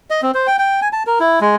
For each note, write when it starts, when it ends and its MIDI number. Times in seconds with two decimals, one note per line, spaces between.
0.10 0.21 75
0.22 0.31 60
0.34 0.47 72
0.47 0.57 79
0.59 0.80 79
0.82 0.88 80
0.93 1.03 81
1.07 1.19 70
1.20 1.39 64
1.41 1.56 56